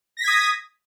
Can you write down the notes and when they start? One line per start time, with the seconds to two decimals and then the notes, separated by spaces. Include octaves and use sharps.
0.17 A#6
0.20 B6
0.24 G#6
0.27 D#6